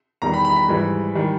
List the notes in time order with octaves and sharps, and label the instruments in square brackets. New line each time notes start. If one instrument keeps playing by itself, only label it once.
[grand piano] E2 D#3 G3 A#5
B5
B5
B5
G#2 E3 G3
D#3 G3